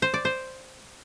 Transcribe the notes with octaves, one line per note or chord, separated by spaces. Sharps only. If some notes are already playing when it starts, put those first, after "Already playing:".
C5
D5
C5